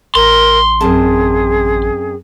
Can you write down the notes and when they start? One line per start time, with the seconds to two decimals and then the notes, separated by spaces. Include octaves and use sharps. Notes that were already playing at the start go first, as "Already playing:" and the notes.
0.15 A1 A#4 C6
0.81 F#2 C4 G#4 A5